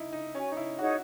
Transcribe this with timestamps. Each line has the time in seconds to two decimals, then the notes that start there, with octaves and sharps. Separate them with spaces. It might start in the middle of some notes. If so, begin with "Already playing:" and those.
Already playing: D#4 E4
0.13 D#4
0.34 C#4 F#4 C#5 G#5
0.52 D#4
0.57 E4
0.79 D#4 F#4 G#4 C#5 F#5